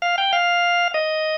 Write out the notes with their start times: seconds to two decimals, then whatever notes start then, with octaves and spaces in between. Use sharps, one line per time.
0.02 F5
0.18 G5
0.33 F5
0.94 D#5